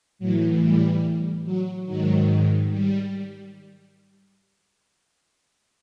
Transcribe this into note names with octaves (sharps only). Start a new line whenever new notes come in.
A2 E3 F#3
G3
F#3
G#2 D#3 F#3
G3